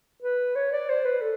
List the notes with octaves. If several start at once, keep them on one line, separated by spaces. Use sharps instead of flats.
B4
C#5
D5
C5
B4
A4